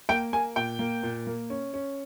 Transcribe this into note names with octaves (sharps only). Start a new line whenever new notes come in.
A#3 G5
A#3 G#5
A#2 G5
A#3
A#2
A#3
C#4
C#4